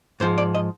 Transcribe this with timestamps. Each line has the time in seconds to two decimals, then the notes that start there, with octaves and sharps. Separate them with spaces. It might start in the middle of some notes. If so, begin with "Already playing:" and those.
0.20 G#2 F3 G#3 C5
0.38 D5
0.55 D#5